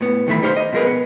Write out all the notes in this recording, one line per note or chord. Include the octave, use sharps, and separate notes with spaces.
A2 B3
B1 D#3 E3 A3 B5
D#4 G4 C5 F5 A#5 C6
D#5
B2 F3 G#3 A#4 B4
B3